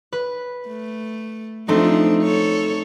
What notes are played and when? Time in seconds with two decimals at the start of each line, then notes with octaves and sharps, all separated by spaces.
0.12 B4
0.67 A3
1.68 F3 A3 C4 D4 D#4
2.23 A4 C#5